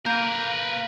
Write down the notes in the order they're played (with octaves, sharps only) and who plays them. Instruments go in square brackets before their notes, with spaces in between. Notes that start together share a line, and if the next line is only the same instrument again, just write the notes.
[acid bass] A#3 [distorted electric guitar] A#4 B4 [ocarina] F5 [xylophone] A#5 G6